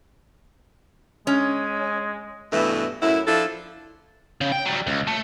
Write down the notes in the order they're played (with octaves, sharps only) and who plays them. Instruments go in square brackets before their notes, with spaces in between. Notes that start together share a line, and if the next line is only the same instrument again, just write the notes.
[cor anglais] G#3 [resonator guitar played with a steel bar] C#4
[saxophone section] G2 B2 E3 A3
F#2 A2 E4
F3 D4 E4 A4
[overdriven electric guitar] C#3
G5
F#3 G3
C#2
A3